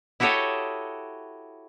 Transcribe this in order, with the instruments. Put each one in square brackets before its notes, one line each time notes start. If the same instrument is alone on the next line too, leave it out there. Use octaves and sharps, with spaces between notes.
[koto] E4 F#4 G4 A4 C#5 D#5